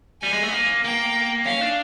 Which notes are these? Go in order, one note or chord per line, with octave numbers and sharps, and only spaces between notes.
G3 G#5
G#3
A3
B3
A#3
A#3 G5
C#4 F5
D4